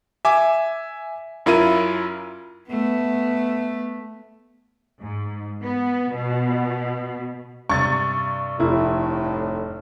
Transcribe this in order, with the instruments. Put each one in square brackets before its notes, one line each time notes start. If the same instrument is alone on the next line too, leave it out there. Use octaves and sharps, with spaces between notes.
[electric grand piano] E5 G#5 D6
F#2 E4 F4 A#4 D#7
[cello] A3 B3
[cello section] G#2
B3
B2
[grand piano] G2 C3 [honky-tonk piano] C#6 A6
[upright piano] F1 E4 [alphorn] A2